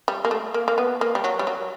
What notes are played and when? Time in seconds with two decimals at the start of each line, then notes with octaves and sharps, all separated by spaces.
0.08 G3
0.25 A#3
0.31 A3
0.54 A#3
0.68 A#3
0.78 B3
1.01 A#3
1.15 G3
1.24 F#3
1.39 G3
1.47 F#3